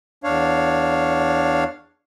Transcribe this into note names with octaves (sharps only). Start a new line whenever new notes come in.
E2 D4 C#5 F5